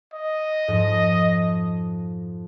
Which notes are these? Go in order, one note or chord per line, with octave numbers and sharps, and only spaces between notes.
D#5
F2 G#2 F3